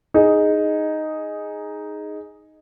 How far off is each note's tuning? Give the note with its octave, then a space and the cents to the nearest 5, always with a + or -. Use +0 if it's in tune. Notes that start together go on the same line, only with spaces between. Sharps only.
D#4 +0 G#4 +0